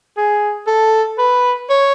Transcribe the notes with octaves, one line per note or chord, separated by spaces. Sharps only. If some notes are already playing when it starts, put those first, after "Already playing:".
G#4
A4
B4
C#5